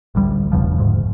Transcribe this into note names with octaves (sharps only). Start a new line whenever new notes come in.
A1 D2 G3
E1 E2 C#3 F3
D2 G#2